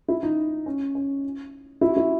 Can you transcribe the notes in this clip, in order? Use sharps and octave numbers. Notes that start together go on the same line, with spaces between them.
E4
D#4
C#4
C#4
E4
F#4
E4